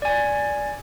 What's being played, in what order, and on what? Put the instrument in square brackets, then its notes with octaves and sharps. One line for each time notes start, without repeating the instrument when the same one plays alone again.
[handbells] D5 G#5